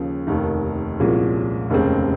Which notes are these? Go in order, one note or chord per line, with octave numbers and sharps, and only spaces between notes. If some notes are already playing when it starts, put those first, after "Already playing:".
Already playing: D#2 C#3 F3
F1 D#2 D#3
C2 A#2 F3 G#3 C#4
F1 D#2 C#3 G#3 C4